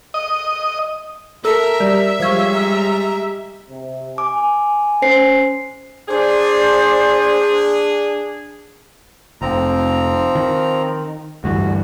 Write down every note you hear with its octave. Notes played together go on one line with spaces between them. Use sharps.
D#5
A4 A#4 E5 A#5
G3
F3 G3 G#3 C#5 F5
A#5
C3
G#5 D6
C#4 C5 C7
D4 G#4 C5 D5 D6
F1 F3 C4 A#5
D#3
D2 G2 E3 F#4